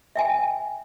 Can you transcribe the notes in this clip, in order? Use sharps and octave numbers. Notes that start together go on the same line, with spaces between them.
E5 G5 G#5